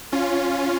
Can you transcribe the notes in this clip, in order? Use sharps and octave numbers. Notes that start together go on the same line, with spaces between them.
C#4 F4